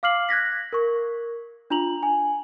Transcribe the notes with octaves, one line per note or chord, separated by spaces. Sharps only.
F5 D6 F6 C7 F#7
F#6 G#6 A#6 B6
A#4 C#6
D4 F4 A#5 F7 F#7
G#5